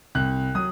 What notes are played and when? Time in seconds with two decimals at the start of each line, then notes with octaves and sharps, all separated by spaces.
0.15 C2 F#6
0.55 F#3 D#6